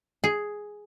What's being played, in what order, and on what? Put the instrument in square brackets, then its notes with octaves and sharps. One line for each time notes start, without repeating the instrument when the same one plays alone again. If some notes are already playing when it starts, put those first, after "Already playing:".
[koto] G#4